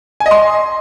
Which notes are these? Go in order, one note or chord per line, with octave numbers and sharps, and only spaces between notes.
G#5
D#5
C6